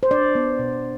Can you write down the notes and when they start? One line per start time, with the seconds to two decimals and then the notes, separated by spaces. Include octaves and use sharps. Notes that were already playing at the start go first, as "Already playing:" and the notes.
0.03 C5
0.11 D4 D5
0.35 B3
0.59 B2